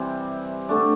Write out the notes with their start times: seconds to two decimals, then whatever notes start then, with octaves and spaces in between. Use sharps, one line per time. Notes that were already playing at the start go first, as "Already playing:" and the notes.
Already playing: C3 E3 G3 C4
0.69 D3 A3 D4